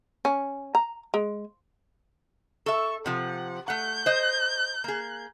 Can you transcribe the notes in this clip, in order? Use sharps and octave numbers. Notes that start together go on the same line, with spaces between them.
C#4
A#5
G#3
A4 E5 C#6
C3 F3 F#5
A3 F#5 G6
C5 D#5
A#3 G#4